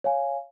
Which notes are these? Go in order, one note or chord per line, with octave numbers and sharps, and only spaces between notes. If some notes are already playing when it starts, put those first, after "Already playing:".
C#5 F5 G#5